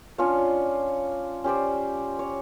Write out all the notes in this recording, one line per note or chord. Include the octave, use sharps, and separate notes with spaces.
C#4 D4 F4 C#5
C#4 G4 C5 D5
C#5